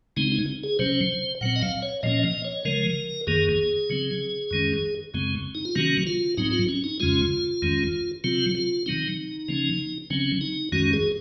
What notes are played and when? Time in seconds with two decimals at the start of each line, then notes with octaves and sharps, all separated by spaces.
0.17 C#3 G#3 C4 D#4
0.32 D#4
0.63 G#4
0.79 C3 F#3 C#4 C5
1.41 A#2 F#3 C4 F#5
1.56 D#5
1.61 F5
1.82 C#5
2.03 A#2 F3 A#3 C#4 D#5
2.23 D#5
2.45 C#5
2.65 C#3 F3 G#3 A#4
3.27 F#2 D#3 A#3 G#4
3.90 C#3 F#3 C4
4.51 F#2 D#3 G#3 C#4
5.14 F#2 C#3 G#3 C4
5.55 D#4
5.65 F4
5.75 C3 D#3 F#3 A#3 C#4 F#4
6.07 F4
6.37 G#2 F#3 C4 D#4
6.53 F4
6.69 C#4
6.84 D#4
7.00 F2 C#3 G#3 C#4 F4
7.62 F2 D#3 G#3 C#4
8.24 C3 F#3 C4 F4
8.55 F4
8.86 C3 D#3 F#3 C4 D#4
9.48 C#3 F3 A#3 C#4
10.10 C#3 F#3 C4 C#4
10.41 D#4
10.72 F#2 D#3 G#3 C#4 F#4
10.93 G#4